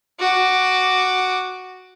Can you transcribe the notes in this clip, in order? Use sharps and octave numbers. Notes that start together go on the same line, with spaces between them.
F#4 D6